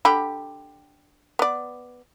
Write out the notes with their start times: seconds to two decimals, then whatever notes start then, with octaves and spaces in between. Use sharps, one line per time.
0.05 D3 G4 B5
1.39 B3 D5